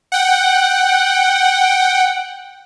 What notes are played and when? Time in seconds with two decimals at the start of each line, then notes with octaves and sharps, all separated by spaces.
0.12 F#5 G5